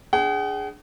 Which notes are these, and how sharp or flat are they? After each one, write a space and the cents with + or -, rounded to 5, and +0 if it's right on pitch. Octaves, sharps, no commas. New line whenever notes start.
D4 +0 G#4 +0 F#5 +45